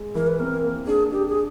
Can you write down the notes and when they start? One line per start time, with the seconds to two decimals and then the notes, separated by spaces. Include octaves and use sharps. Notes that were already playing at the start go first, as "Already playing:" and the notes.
Already playing: G#3
0.15 E3 A#4
0.27 B4
0.40 C4 A#4
0.64 A#3
0.87 D4 G#4
1.12 D4 G4
1.28 G#4